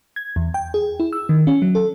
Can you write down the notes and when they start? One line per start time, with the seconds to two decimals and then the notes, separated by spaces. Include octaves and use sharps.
0.16 G#6
0.36 E2
0.54 G5
0.74 G#4
1.00 E4
1.13 E6
1.29 D#3
1.47 C#4
1.62 F#3
1.75 A4